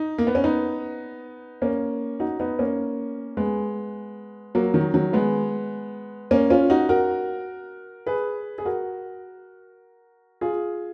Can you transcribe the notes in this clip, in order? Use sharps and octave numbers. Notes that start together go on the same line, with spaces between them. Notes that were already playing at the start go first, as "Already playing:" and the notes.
Already playing: D#4
A#3
B3
C#4
B3 D#4
A#3 C#4
D#4 F#4
B3 D#4
A#3 C#4
G#3 B3
F#3 A#3
D#3 F#3
D#3 F#3
G#3 B3
A#3 C#4
C#4 F4
D#4 F#4
F#4 A#4
G#4 B4
G#4
F#4 A#4
F4 G#4